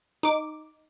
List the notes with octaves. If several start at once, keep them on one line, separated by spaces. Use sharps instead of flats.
D#4 D6